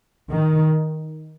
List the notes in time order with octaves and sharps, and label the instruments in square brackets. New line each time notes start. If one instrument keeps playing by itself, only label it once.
[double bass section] D#3